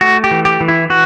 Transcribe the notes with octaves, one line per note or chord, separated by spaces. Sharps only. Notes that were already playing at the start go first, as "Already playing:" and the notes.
A3 F#4
G4
E3
G4
E3
E4
E3 F#4